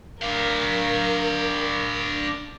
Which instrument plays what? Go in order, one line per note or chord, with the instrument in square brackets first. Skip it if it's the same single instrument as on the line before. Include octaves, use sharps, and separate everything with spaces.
[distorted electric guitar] D4 F5 [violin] A#4